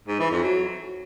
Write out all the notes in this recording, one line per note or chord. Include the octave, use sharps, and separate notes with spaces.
G#2
E3
F2
F#3